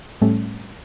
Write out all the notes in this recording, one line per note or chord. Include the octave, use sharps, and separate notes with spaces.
A2 G3 A3 C#4